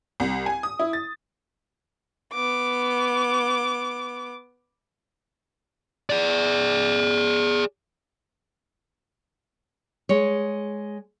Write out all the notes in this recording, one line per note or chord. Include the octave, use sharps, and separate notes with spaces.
C2
G#5
D#6
E4
A6
B3 D6
G#4 D5
G#3 C#5